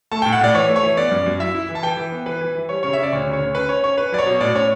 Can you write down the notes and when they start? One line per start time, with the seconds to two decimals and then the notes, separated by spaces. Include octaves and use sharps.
0.12 A3 A5
0.22 G5
0.26 A2
0.32 F#5
0.41 A2 D5
0.54 E3 C#5
0.69 A3
0.76 C#5
0.83 E3
0.97 B3 D5
1.11 F#2
1.26 F#2
1.40 E4 E5
1.55 E4
1.69 E3
1.75 A5
1.83 E3 G5
1.97 E3
2.12 B3
2.26 E3 B4
2.41 E3
2.55 E3
2.69 G3 C#5
2.83 C#3 C#5
2.93 C#3 E5
3.03 D5
3.12 D2 C#5
3.27 C#3
3.33 C#5
3.40 D2
3.55 C#4 B4
3.68 C#4 C#5
3.83 C#4 C#5
3.98 C#4 B4
4.12 F#3 D5
4.18 C#5
4.26 B2
4.41 A2 D5
4.55 C#4 C#5